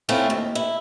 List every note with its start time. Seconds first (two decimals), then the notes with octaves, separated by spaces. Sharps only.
0.09 A3 C4 C#4 E4 F4
0.30 D#2
0.55 E4